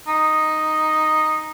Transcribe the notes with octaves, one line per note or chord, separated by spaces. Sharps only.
D#4